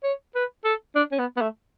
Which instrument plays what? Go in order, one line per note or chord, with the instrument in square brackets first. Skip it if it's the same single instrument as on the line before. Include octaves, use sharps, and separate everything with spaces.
[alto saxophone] C#5
B4
A4
D4
C#4
B3
B3
A3